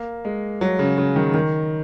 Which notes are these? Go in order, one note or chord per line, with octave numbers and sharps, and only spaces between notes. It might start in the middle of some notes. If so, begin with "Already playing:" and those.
Already playing: A#3
G#3
F#3
C#3
C#3
D#3
D#3